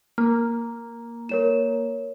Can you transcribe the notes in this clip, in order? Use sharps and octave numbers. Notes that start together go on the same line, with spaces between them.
A#3 F6
A#4 C#5 E7